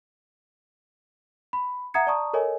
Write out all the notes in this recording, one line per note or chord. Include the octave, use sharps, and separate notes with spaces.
B5
E5 F#5 A#5 D#6 G#6 C#7
D5 A5 A#5 C#6 D#6
A4 A#4 C#5 D#5 G#5